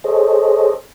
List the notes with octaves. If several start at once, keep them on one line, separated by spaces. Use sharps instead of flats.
G#4 A4 C5 C#5 D#5